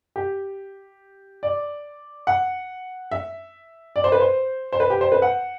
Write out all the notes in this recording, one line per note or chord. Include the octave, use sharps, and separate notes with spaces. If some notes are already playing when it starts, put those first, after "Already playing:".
G4
D5
F#5
E5
D5
C5
B4
C5
C5
B4
G4
C5
B4
F#5